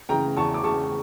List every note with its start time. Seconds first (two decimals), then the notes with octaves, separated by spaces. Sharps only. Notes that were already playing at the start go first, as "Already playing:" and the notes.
0.09 C#3 E3 G5 A#5
0.37 E2 A5 C#6
0.54 D6
0.63 C#3 E3 A5 C#6